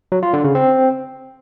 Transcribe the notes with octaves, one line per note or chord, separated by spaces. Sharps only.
F#3
F4
D3
C#3
C4